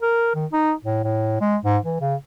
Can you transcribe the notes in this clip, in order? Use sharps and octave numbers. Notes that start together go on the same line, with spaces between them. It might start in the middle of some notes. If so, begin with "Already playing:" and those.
A#4
D#3
D#4
A2
A2
G#3
G#2
E3
C#3